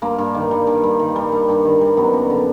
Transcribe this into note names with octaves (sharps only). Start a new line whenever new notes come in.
G2 A#3
G2
D#3
G3
G2
G2
D#3
G3
G2
G2
D#3
G3
F#2 B3
F#2
D3